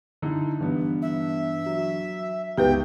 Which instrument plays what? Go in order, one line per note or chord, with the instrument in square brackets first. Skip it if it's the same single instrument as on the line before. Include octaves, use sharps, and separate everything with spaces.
[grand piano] D3 D#4 E4
[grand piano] G2 B3 [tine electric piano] E3 D4
[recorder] E5
[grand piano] F#3
[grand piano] C#2 G6 [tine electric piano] B3 D#4 [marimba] G4 B4 [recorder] G5